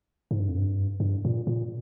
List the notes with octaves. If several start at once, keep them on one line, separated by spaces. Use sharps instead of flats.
G#2
G2
F2
G2
G2
A#2
A#2